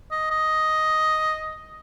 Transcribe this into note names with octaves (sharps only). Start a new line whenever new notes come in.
D#5
D#5